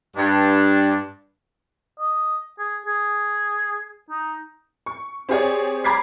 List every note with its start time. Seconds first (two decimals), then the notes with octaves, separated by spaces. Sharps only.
0.17 G2 D4
2.00 D#5
2.58 G#4
2.86 G#4
4.10 D#4
4.86 C#6
5.29 C4 G4 G#4 C#5 D5
5.84 A#5 B5 D6 G#6 B6 C7